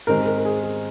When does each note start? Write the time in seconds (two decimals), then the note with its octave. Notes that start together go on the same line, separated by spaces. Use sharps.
0.07 G#2 D#3 G#3 C4 G4 A#4
0.26 A#4
0.38 A#4
0.45 G#4
0.64 G#4